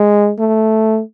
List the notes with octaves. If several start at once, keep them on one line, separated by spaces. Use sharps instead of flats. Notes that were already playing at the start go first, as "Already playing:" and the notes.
Already playing: G#3
A3